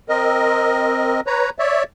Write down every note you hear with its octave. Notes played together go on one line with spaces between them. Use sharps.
C4 A#4 D#5
B4 C#5 A#5
C#5 D5 E5